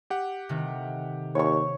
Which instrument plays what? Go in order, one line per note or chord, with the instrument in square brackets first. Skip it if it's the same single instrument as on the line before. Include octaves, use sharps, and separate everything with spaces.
[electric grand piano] G4 F#5
[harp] C3 D#3 A3
[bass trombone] D#2 [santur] C#5 C#6